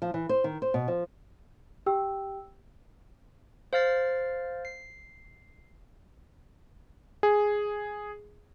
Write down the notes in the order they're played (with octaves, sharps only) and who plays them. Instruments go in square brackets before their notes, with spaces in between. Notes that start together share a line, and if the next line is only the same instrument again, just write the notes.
[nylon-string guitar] F3
E3
C5
D#3
C5
B2
F3
[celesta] G4 G5 E6
[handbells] C5 F5 F6 A6 C7
C7
[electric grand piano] G#4